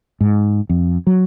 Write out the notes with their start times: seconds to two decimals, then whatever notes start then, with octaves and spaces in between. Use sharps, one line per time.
0.20 G#2
0.69 F2
1.07 F#3